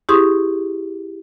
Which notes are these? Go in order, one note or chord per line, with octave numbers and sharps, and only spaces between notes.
E4 G4 G#4 C6 C#6 D#6